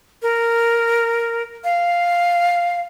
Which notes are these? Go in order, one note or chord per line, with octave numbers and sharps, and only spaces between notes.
A#4
F5